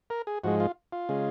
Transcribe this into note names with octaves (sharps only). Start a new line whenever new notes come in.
A#4
G#4
G#2 F3 G#3 F#4
F4
F4
C#3 G#3